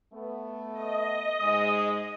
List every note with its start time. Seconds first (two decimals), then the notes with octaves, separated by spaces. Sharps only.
0.12 A3 B3
0.72 D#5
1.40 G#2 G#3 D#6